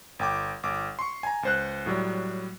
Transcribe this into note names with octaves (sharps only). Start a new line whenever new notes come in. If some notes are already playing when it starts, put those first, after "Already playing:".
G1 G5 D6
G1 D6
C6 C#6
G#5 A#5
C#2 C5 F#6
A2 F#3 G3